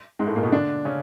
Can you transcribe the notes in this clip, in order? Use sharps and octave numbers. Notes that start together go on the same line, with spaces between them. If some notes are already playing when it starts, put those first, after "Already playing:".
G#2 G#3
A2 A3
A#2 A#3
B2 B3
D3 D4
C#3 C#4